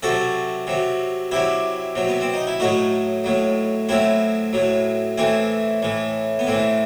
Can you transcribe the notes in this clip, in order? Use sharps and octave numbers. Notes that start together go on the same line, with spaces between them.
C3 F#3 F#4 A4
C3 F#3
C3 F#3 E4 G4
C3 F#3
B3
C4
D#4
E4
A2 F#3 D#4 F#4
A2 F#3
A2 F#3 C4 E4
A2 F#3
A2 E3 C4 E4
A2 E3
B3
A2 E3 C4